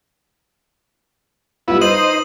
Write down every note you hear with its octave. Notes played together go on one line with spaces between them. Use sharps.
G3 B3 E4 F4
D#4 B4 C5 D#5 D#7 F#7